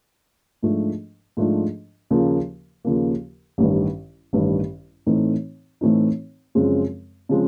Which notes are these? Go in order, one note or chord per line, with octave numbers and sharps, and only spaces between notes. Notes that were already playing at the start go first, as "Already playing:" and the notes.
G#2 F3 A3 D4
G#2 F3 A3 D4
D#2 C#3 F3 A#3
D#2 C#3 F3 A#3
A1 G2 D#3 G3
A1 G2 D#3 G3
A2 E3 A3 C4 D#4
A2 E3 A3 C4 D#4
F#2 C#3 F3 G#3 C4
C#3 F3 G#3 C4